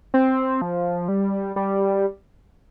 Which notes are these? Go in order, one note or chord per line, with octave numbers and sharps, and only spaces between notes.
C4
F3
G3
G3